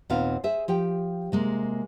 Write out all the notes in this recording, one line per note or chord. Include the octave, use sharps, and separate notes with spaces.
D#2 A#2 B3 C4 D#4 F5
G#4 C5 E5
F3 G4 G5
C3 G#3 A#3